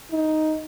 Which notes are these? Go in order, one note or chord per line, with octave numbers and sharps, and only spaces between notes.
D#4